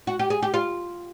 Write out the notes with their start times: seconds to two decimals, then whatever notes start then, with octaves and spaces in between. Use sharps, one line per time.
0.07 F#4
0.19 G4
0.30 G#4
0.42 G4
0.54 F4